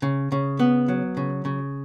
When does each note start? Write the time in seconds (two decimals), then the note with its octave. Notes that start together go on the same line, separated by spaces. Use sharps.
0.02 C#3
0.32 C#3
0.59 B3
0.88 F#3
1.17 C#3
1.45 C#3